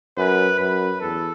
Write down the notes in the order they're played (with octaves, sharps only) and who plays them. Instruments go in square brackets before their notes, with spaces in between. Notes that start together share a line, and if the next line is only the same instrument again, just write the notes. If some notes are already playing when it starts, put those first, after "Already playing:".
[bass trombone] F#2 [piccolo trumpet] B4
[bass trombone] F#2 [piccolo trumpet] B4
[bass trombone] E2 [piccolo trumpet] A4